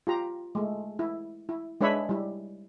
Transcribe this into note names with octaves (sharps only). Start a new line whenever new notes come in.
F4 G4 A#5
G#3 A3
E4
E4
G#3 D4 B4 C#5 E5 B5
G3 E4